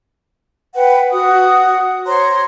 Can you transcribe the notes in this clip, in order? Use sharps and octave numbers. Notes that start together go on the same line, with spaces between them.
B4 F#5 G5
F#4 F#5 D#6
C5 C#5 A#5 C6